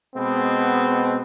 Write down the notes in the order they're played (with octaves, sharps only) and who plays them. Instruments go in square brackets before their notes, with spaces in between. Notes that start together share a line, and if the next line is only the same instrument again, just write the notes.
[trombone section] B2 G#3 B3 C4